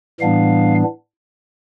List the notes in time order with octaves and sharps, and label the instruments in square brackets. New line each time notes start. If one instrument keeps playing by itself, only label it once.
[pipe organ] A2 E3 G3 B3 D4 F5